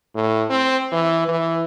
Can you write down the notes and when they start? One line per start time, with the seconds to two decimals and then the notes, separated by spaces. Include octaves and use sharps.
0.15 A2
0.50 C4
0.92 E3
1.28 E3